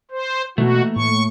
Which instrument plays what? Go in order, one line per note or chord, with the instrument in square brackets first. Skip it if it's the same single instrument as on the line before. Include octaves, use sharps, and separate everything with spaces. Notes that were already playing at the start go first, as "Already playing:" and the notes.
[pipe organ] C5
[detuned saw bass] B2 [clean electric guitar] E3 A3 [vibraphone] A#3 [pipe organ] F#4
[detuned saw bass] A2 [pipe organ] C#6